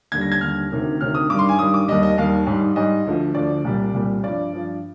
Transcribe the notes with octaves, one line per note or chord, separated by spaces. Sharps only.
D#2 D3 G3 G#6
A#6
G#6
D#2 D3 G3 F6
D2 C3 D#3
D2 C3 D#3 F6
D#6
G2 D#3 G3 D6
C6
G#5
G2 D#3 G3 D#6
D6
D#2 D#3 G3 D#5
D#5
D#2 D#3 G3 F5
G#2 G3
G#2 G3 D#5
D2 D3 F3
D2 D3 F3 D5
C2 A#2 G3
C2 A#2 G3
G2 F3 D5
G2 F3